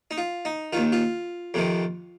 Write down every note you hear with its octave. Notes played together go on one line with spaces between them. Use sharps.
D#4
F4
D#4
D#2 D#3 F4
F4
F2 C3 D#3